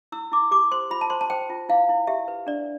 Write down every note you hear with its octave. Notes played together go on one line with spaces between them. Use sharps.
E4 E6
E4 D6
G4 D6
C5 C6
F4 B5
A5
C5 C6
A5
C5 G5
F4
E4 F5
E4
G4 E5
B4
D4 D5